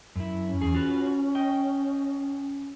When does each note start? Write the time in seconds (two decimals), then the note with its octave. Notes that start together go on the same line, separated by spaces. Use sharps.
0.16 F#2 E4
0.46 C#4
0.61 E2 G#4
0.75 F4 F#4 B4
1.35 D#5 G5